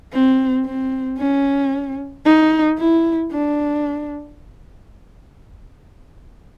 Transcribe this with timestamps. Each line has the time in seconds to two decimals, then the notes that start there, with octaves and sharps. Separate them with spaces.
0.13 C4
0.66 C4
1.19 C#4
2.25 D#4
2.78 E4
3.32 D4